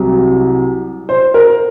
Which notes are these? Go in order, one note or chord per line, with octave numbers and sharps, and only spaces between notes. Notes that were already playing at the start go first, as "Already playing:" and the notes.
Already playing: C2 C3 F#3
C5
A#4